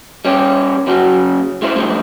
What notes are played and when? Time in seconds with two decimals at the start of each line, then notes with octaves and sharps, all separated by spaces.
0.25 G3 C#4 G4
0.87 C#3 F#3 F#4 G#4
1.62 G#3 E4 C5
1.75 A2 D3 F3 G3 G#3